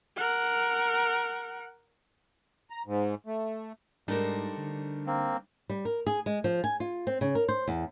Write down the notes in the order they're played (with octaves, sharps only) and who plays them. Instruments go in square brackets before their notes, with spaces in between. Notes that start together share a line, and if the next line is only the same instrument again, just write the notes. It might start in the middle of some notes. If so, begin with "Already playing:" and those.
[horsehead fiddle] A#4 F#5
[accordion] A#5
G#2
A3
[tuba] G#2 [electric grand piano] G3 D4 D#4 [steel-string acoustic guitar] A3 A#4 C5
[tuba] D3
[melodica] A#3 C4
[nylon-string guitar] G3
A#4
G#4
G#3
F3
G#5
F4
C4
C#3
A#4
C5
E2